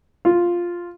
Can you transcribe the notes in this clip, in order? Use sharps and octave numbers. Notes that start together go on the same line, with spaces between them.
F4